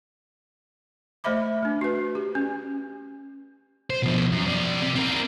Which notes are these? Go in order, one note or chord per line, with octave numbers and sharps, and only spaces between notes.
A3 C5 D#5 E5 B5 D6
A3 D4
F#4 B4
G4
C#4
C5
B2 F3
F#2
F3 D5
C3
C4 A#4